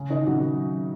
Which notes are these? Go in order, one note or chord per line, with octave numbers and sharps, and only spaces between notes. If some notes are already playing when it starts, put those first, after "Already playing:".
Already playing: C#3 C#4
D#3 D#4
F#3 F#4